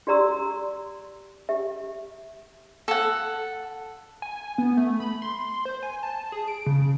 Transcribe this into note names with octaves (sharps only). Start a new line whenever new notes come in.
F#4 G4 D5 A#5 C6 E6
G4 E5
A4 F#5
G#5
B3
A3
B5
C6
C5
G#5
A5
G#4
D7
C#3